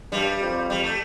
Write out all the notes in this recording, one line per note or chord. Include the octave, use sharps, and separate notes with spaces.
G2 G3
F2
G3
A3